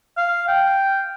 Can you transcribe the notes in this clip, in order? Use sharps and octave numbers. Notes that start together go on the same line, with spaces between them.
F5
G5